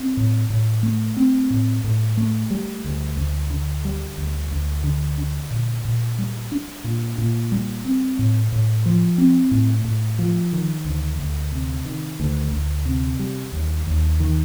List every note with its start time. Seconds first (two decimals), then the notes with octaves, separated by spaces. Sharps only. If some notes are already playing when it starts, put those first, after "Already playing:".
Already playing: C4
0.17 A2
0.50 A2
0.83 A3
1.17 C4
1.50 A2
1.84 A2
2.17 A3
2.51 G3
2.84 D2
3.17 D2
3.50 D3
3.85 G3
4.18 D2
4.51 D2
4.84 D3
5.18 D4
5.51 A#2
5.85 A#2
6.18 G3
6.52 D4
6.84 A#2
7.18 A#2
7.52 G3
7.85 C4
8.19 A2
8.52 A2
8.86 F3
9.18 C4
9.51 A2
9.85 A2
10.19 F3
10.53 D#3
10.85 D2
11.20 D2
11.52 C3
11.86 D#3
12.20 D2
12.52 D2
12.85 C3
13.19 G3
13.52 D#2
13.87 D#2
14.20 D#3